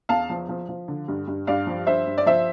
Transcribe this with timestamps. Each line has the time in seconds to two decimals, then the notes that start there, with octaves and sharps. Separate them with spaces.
0.09 E2 F5 A5
0.30 F3
0.49 F3
0.69 F3
0.88 D3
1.08 G2
1.27 G2
1.47 G2 D5 F5
1.67 F3
1.87 G2 C5 E5
2.07 G2
2.18 D5
2.26 F3 C5 E5